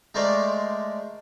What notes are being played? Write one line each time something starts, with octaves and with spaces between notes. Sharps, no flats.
G#3 A3 A#4 C5 D5